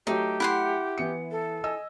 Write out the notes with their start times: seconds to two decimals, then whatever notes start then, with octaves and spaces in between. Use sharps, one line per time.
0.07 F#3 A3 D#4 G4
0.40 E4 F#5 C6
0.98 E3 B3 C#7
1.31 A4
1.64 D#5 G#5 E6